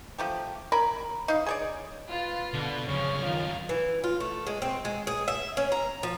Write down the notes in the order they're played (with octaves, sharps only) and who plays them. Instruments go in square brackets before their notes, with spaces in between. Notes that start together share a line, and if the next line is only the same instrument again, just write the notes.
[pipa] F3 A3 G4
C#4 A#4 B5
D#4 F5
G#4 C#5 D5
[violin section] F4 [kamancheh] B4
[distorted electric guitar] B2 [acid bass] D3
[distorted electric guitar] F#2 F3 [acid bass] C#3 [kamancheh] C#5 [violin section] F6
[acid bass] D#3 [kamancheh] F4
[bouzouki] E3
F4
A3
G#3
C4
G#3
G#4
E5
C#4
A#5
F3